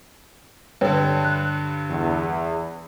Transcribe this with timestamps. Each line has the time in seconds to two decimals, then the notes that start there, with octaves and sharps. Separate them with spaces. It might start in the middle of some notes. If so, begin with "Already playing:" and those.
0.81 G2 D3 B4 C#5 G5
1.24 F#6
1.90 E2